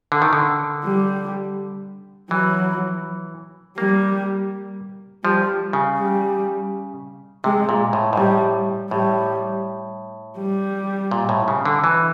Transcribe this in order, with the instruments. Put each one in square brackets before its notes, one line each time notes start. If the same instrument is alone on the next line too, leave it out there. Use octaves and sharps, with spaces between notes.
[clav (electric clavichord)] D3
D#3
D3
[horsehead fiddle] G3
[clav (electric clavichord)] E3 [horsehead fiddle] F#3
[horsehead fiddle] G3 [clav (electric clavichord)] A#3
[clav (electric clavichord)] F3 [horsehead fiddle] G3
[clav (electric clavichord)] C#3
[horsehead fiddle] G3
[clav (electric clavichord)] C3 [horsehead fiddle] G#3
[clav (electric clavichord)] A#2
A2
G#2
[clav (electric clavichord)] A2 [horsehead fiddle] G3
[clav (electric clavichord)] A2 [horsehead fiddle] G3
[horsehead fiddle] G3
[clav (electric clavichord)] A#2
A2
C#3
D3
E3